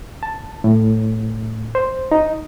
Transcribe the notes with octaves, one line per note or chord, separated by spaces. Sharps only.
A5
A2
C5
D#4